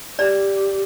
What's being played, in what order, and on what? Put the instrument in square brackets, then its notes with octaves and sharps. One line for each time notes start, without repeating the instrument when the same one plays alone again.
[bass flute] G4 [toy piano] D5